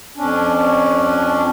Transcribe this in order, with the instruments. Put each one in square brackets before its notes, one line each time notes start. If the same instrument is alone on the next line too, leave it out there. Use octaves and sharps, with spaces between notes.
[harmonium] F2 C#4 D4